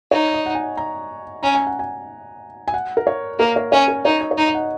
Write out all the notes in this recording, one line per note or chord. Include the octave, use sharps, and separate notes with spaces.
D#4 C#5
D#5
F#5
G#5
A#5
C#4 A#5
G#5
F#5
G#5
G#5
F#5
A#4
C#5
A#3 A#4
C#5
C#4 C#5
A#4
D#4 C#5
D#5
C#5
D#4 D#5
D#5
F#5